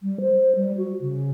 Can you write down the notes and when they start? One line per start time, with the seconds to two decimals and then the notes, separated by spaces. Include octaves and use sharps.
0.03 G3
0.21 C5
0.55 G3
0.78 F#4
1.01 C#3